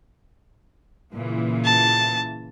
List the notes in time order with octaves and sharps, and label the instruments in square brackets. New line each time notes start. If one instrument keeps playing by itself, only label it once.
[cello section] A#2 C#3 E3
[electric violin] A5